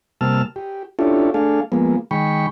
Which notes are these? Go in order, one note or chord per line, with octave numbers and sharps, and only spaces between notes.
C3 G3 A#3 A5 E6 F6
G4
C#4 D4 E4 F4 G4 A4
A3 D4 G#4 A4 F5
F3 G#3 A#3 B3
D#3 G#3 G5 B5 C#6